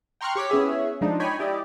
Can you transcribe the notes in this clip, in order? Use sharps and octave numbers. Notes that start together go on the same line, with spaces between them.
G5 A#5 C6 C#6 F6 F#6
G4 C#5 D6 B6
B3 C#4 E4 G#4 E5
F3 G#3 D4 D#4
C#5 D#5 G5 G#5 B5
E4 G4 D5 D#5